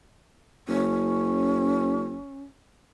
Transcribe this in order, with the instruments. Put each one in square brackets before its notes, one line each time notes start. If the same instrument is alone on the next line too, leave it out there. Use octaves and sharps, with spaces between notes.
[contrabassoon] F#1 [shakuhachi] C#4